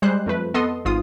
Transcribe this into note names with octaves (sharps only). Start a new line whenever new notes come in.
G3 G#3 C5 F#6
F2 A3 B4
B3 A4 D#5 C6 D#6
G#1 G#2 F4 D#6